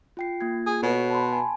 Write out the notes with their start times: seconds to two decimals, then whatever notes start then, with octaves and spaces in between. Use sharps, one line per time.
0.17 F4 G5 C7
0.41 A#3 F4 G#6
0.66 G#4
0.82 B2 F#4 A4 C#5
1.10 A5 B5 C6
1.31 G#5 A5